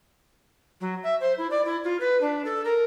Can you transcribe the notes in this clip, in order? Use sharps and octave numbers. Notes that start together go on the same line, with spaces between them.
F#3
E5
C5
E4
D5
E4
F4
B4
D4
A4
A#4